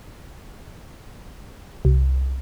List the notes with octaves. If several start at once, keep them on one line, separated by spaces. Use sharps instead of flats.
C2